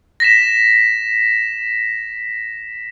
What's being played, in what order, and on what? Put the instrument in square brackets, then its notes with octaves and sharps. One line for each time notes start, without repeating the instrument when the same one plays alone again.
[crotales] A#6 B6 E7